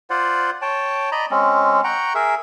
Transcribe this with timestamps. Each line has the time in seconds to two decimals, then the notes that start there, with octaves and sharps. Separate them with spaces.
0.10 F4 C5 D5 F#5
0.62 C#5 G5 A5
1.12 D5 D#5 A#5 B5
1.31 G#3 C4 C#4
1.84 F#5 G5 A#5 C#6
2.15 G#4 A#4 E5